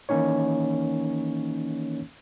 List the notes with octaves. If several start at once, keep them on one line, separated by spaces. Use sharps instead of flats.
D#3 E3 A#3 C#4 D#4 C#5